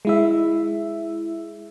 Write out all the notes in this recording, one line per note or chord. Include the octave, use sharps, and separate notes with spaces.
G#3 E4 E5